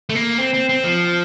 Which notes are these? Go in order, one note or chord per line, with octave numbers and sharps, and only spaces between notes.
A3
A#3
C4
C4
C4
F3